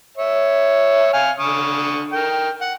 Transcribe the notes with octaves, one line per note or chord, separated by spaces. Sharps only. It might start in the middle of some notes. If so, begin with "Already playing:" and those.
C#5 E5
F5 G#5
D3 C#6 D#6
A#4 G5
F#5